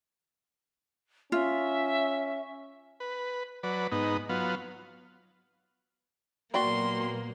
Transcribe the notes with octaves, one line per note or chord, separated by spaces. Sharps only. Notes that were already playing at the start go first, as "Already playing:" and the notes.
C#4 F4 E5
B4
F#3 B4 D5
G#2 B3 D#4
F#3 B3 F4
A#2 F#3 A#3 B3 F#4 D5 G5 C6